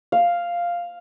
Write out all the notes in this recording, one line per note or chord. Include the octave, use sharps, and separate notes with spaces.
F5